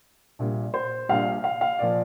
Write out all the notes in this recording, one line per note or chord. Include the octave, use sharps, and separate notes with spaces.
A#1 A#2 G3
C5
A#1 A#2 G3 F5
F5
F5
A#2 F3 D5